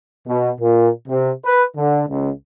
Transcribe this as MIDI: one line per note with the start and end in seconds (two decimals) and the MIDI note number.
0.28 0.51 47
0.60 0.90 46
1.08 1.31 48
1.45 1.64 71
1.77 2.04 50
2.09 2.30 37